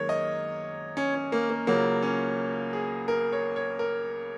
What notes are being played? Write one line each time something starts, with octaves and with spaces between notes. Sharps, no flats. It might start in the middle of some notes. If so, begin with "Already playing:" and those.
Already playing: F#2 D#3 G#3 A#3 A#4 C#5
D#5
C#4
C#4
A#3
A#3
C#2 C#3 F#3 A#3
C#4
G#4
A#4
C#5
C#5
A#4